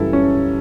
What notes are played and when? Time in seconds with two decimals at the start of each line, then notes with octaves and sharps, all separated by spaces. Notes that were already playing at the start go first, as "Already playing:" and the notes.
Already playing: F#2 C#3 E3 G3 E4 A4
0.13 C#4